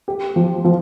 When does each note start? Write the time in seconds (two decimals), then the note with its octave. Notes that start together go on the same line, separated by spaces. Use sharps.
0.08 G4
0.36 F3
0.65 F3